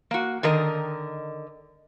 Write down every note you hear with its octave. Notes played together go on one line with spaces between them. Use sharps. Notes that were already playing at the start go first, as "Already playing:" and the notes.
A#3 F#4
D3 D#3 A#4 D#5